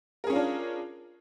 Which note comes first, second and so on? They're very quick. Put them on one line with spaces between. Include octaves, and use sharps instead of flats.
A#4 G#4 C#4 F4 D4